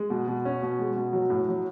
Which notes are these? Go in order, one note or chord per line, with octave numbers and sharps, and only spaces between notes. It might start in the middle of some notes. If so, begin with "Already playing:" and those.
Already playing: G#3
B2
B2
C#4
B2
G#3
B2
F#3
A2
F#3